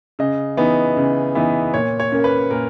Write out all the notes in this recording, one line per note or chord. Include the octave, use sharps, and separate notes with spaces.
C#3 D#5
E3 B3 D#4
C#3
E3 B3 D#4
A#2 C#5
C#5
A#3 C#4
B4
A#2 A#4